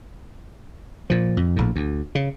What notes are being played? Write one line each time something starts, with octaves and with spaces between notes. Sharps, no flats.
A#2 F3
F2
A#1 A2
D2
C#3